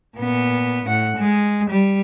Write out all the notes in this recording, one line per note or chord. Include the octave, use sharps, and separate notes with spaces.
A#2 B3
A2 F#5
G#3
G3